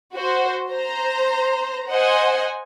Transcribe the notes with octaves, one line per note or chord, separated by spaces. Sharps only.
F#4 C5
C5 A#5
C5 D#5 F#5 G#5